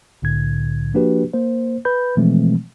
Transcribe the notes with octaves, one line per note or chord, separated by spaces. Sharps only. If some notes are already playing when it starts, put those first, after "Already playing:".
C2 A2 D3 G#6
F3 A#3 D4 F#4 G4 B4
A#3 C5
B4 B5 G6
B2 E3 F3 G#3 A3 C4